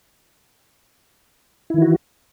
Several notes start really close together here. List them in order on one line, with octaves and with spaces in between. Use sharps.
E4 D#3 E3 F#4